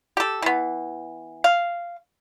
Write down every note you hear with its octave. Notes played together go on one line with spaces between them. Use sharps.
G4 A4
E3 B3
F5